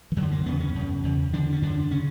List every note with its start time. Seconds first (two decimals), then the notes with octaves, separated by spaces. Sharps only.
0.12 E3
0.16 F#2 D3 F#3
0.32 A#3
0.46 E2 C#3 B3
0.60 C#4
0.75 F#2 C#3
1.03 E2 C#3
1.33 E2 D3 D4
1.53 C#4
1.62 F#2 D3 D4
1.91 C#3 C#4